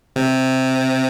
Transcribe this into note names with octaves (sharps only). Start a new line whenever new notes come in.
C3